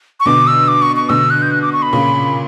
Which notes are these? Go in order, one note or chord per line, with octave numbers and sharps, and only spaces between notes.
C#6
B2 D3 D6
E6
D6
C#6
C#6
B2 D3 E6
F#6
G6
F#6
D6
C#6
B5
A#2 C#3